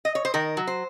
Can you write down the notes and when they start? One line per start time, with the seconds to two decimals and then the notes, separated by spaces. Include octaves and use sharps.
0.05 D#5
0.15 C#5
0.25 C5
0.34 D#3 A#4
0.57 F#3
0.67 C5